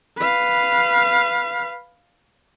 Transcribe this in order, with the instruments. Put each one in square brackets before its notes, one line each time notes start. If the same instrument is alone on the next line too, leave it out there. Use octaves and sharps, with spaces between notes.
[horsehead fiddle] B4 F5